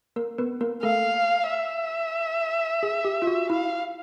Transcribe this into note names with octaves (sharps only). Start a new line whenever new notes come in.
A#3 A#4
B3 B4
A#3 A#4
A3 A4 F5
E5
G#4
G4
F4
F#4
E4 F5